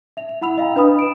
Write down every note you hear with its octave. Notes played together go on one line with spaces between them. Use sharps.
E5 F7
F7
E4 F#5 B5 E6 F7
D#5 F5 G5 A#5
D4 B4 D#5 B5 D#6
D7 E7